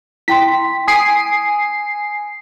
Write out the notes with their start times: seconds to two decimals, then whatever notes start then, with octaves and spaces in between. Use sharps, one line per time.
0.28 E4 G5 C6 B6
0.88 G#5 D#6 C7 D7 D#7